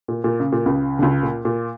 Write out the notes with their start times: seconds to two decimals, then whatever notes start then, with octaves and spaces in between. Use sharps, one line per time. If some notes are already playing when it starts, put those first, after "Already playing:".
0.08 A#2
0.24 A#2
0.40 C#3
0.52 A#2
0.66 C#2 C#3
0.99 D3
1.02 C#2 C#3
1.23 A#2
1.45 A#2